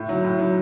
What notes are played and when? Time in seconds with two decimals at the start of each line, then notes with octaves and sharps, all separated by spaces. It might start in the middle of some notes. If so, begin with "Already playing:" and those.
Already playing: A2
0.09 F#3
0.24 A2
0.39 F#3